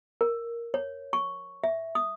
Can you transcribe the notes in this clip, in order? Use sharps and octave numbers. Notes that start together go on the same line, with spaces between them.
A#4
C#5
C#6
E5
D#6